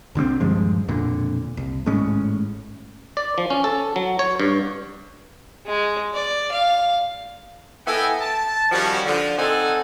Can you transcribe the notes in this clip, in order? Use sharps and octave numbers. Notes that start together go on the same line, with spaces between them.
C2 D3 A3 C4
D#1 G2 F3 G#3
E1 F2 A#2 D3
C2
G#1 A2 G#3 C#4
D5
F3
C#4
A4
F#3
C#5
G2
G#3
D5
F5
B3 E4 A4 D#5 G5 G#5
A5
D#3 F3 G3 C#4 F#4
D3 F3
C4 D#4 A4 D5 F#5 G#5